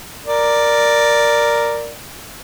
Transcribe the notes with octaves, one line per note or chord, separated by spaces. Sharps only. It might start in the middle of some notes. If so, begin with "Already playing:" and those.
A#4 D5